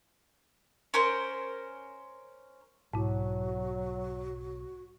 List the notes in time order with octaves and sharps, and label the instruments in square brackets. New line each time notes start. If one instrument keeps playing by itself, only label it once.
[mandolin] C#4 A#4 C5
[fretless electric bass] B1 [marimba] G#2 E4 [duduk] F#3 [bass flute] F#4